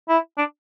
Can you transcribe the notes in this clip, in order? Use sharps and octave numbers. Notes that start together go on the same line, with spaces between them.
E4
D4